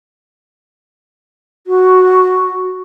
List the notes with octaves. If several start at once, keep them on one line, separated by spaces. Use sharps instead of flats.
F#4